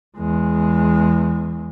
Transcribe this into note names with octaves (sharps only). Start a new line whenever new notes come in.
E2 G#3